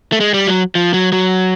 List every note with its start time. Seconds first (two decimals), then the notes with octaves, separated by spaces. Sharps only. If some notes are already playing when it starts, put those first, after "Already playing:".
0.12 A3
0.20 G#3
0.34 G3
0.47 F#3
0.75 F3
0.94 F#3
1.12 F#3